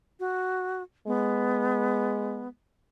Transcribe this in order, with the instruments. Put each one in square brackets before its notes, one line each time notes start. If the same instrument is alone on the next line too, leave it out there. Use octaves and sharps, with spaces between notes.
[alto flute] F#4
[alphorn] G#3 [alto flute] B3